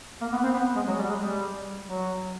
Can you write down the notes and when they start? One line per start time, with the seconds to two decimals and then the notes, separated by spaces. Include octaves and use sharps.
0.21 A#3
0.32 B3
0.44 C4
0.54 B3
0.76 G#3
0.88 F#3
0.99 G3
1.09 G#3
1.20 G3
1.87 F#3